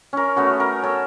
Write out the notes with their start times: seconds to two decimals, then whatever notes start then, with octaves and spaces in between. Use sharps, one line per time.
0.13 C#4 A#4
0.36 A3 B3 C#4 F#4
0.60 A#4
0.83 A4 C#5